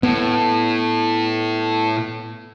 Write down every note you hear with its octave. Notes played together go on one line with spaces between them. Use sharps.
A2 B3